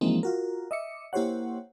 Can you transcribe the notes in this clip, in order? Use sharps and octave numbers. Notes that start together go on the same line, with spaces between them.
E3 F3 G#3 A#3 C4 D#4
F4 F#4 A#4
D#5 E5 D6 C#7
A#3 E4 G4 C5 C#5 F#5